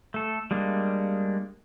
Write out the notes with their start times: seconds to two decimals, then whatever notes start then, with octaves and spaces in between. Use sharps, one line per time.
0.14 A3 A4
0.51 G3 G#3 A#3 D4